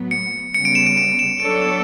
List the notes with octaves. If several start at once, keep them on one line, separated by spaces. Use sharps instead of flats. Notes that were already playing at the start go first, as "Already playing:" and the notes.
Already playing: A2 F#3 B3
C#7
C#3 G3 B3 C#7
D7
E7
D7
D7
E7
F#3 B3 D4 A4 C#5 D7
E7